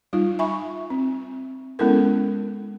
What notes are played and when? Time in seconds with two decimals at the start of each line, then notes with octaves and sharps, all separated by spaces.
0.13 G3 D#4 F4
0.39 E5 G#5 B5 C#6
0.90 C4
1.79 G#3 B3 C#4 E4 A4 A#4